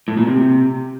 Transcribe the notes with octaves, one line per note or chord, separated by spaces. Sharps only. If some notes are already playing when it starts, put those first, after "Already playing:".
A2
A#2
C3